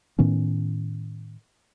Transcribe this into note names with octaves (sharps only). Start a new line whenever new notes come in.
A2 D#3 B3 C#4